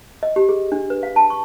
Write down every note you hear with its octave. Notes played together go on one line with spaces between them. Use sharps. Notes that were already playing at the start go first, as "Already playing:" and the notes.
D#5
G4
G#4
D4
B4
F5
A5
C#6